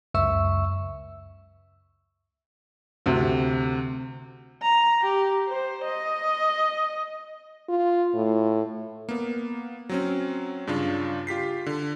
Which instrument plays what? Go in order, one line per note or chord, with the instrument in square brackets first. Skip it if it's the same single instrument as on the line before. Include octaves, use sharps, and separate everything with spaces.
[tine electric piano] C#2 F#2 E5 C#6 E6
[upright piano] D2 C3
[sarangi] A#5
G4
C5
D#5
[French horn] F4
A2
[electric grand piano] A#3 B3
F#3 C4 C#4
G2 C#3 D4 F4
F4 G4 B6 C7
D3